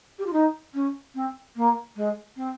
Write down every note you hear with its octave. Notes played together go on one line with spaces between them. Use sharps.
G4
F4
D#4
C#4
C4
A#3
G#3
C4